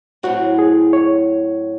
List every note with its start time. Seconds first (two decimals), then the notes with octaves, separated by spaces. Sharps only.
0.23 A2 F#3 C4 F#4
0.59 G#4
0.93 C#5